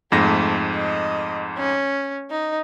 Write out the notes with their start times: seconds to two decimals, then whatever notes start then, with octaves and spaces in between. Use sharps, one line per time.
0.12 F2 G#2 A3 A#6
0.75 D#5
1.58 C#4
2.31 D#4